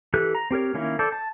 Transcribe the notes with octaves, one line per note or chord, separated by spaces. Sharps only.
E3 G4 A4 F#6
A#5
C4 G4 A#4 C#5
D#3 A#3 C#4 E4
A4 C5 D5
A5